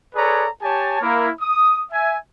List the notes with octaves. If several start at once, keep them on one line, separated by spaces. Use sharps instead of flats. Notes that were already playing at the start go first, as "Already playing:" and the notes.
G#4 A4 B4 C#5 D5 A#5
G4 C#5 G#5 A5
A#3 E4
D#6
E5 G#5